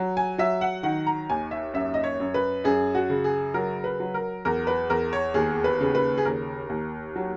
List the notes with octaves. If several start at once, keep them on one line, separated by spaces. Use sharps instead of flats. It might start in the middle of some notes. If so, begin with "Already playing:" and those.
Already playing: F#3
G#5
F#3 E5
F#5
D#3 F#5
A#5
D#2 G#5
E5
F#2 E5
D#5
C#5
F#2
B4
F#2 G#4
F#4
C#3
G#4
F#3 A#4
B4
F#3
A#4
E2 A#4
B4
E2 A#4
C#5
D#2 G#4
B4
C#3
B4
G#4
D#2 A#4
D#2
F#3